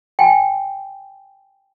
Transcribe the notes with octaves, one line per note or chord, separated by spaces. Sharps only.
G5 G#5